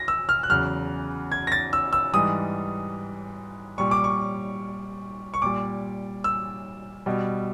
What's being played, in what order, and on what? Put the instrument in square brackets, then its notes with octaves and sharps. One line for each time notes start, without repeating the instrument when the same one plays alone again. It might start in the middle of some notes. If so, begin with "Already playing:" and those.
Already playing: [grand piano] A#6
E6
F6
F#6
E2 C#3 F#3 F6
G#6
A#6
A6
E6
E6
G#2 E3 G3 D#6
A#2 G3 C#6
D6
C#6
C#6
A#2 G3 D6
E6
B2 G3